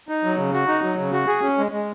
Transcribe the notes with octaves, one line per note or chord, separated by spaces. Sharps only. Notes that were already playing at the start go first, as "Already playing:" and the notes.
D#4
F#3
C#3
F#4
D#4
F#3
C#3
F#4
G#4
C#4
G#3
G#3